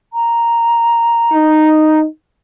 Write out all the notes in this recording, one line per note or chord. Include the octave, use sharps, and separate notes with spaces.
A#5
D#4